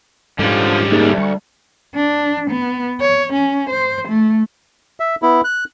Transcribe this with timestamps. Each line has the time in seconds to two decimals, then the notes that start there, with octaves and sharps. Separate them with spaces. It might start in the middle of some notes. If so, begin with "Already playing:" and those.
0.39 G#2 D3 F3 G3 C#4
0.92 D2 A#3 D#4 G#4
1.18 G3 C#6
1.95 D4
2.50 B3
3.00 C#5
3.33 C#4
3.70 C5
4.08 A3
5.00 E5
5.22 B3 E4
5.44 F#6